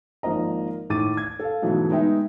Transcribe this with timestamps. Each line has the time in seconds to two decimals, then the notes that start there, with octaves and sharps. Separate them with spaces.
0.23 G#1 F3 A#3 D#5 A#5
0.90 D#2 A2 D6 A6 D#7
1.17 G#6
1.40 A4 F5
1.62 G#2 B2 E3 F#3 G#3 A3
1.91 G#3 B3 D#4 E5 G5